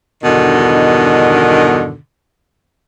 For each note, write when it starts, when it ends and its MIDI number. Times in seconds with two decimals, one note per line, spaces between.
0.24 1.95 40
0.24 1.95 43
0.24 1.95 47
0.24 1.95 50
0.24 1.95 51